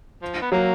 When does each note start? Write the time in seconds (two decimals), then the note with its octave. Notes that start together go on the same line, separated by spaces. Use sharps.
0.22 F3
0.42 B3
0.52 F#3 A#3